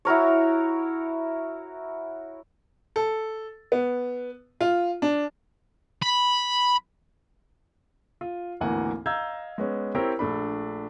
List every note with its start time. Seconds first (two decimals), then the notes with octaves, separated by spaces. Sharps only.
0.05 E4 F#4 A#4 C#5
2.96 A4
3.72 B3
4.61 F4
5.02 D4
6.02 B5
8.21 F4
8.61 G#1 D2 E3 A#3 F#5 G#5
9.06 D#5 F5 A#5 E6 G6 G#6
9.58 G#3 B3 C#4
9.95 C4 E4 G4 A#4 C5 C#5
10.19 A#1 A3 D4 B5